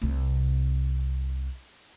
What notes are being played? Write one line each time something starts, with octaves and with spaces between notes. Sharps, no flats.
C2 C3